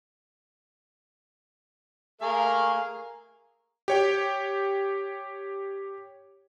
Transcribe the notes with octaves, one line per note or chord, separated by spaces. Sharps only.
A3 G#4 A#4 F5
G4 C#5 G5